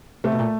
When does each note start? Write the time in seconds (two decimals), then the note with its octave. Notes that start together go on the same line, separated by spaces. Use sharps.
0.24 C3 A3
0.32 B2
0.39 A#2